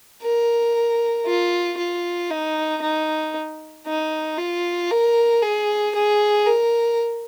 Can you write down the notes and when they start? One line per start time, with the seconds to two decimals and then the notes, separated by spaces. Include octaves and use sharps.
0.22 A#4
1.26 F4
1.77 F4
2.30 D#4
2.82 D#4
3.87 D#4
4.38 F4
4.91 A#4
5.42 G#4
5.95 G#4
6.47 A#4